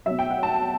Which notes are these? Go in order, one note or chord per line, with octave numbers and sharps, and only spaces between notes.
B2 F#3 E5
G5
F#5
A5